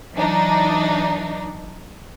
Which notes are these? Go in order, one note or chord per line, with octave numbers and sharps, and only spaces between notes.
E3 F#3 D4 D#4